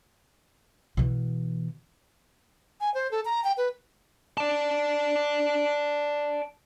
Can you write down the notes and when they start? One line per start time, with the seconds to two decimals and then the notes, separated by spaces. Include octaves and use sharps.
0.97 B2 E3
2.81 G#5
2.94 C5
3.11 A4
3.25 A#5
3.44 G5
3.57 B4
4.37 D5 A5